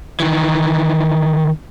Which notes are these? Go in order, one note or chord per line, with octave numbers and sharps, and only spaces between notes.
D#3 E3